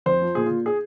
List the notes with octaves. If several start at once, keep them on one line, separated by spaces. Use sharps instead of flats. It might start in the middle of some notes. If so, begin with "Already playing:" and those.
F2 C5
F3
A#2 G#4
A#2 F4
G#4